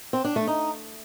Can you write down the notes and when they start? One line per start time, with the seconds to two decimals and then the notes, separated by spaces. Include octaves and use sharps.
0.13 C4
0.25 D4
0.36 A3
0.47 D#4